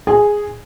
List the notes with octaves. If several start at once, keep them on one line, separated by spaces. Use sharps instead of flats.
G#4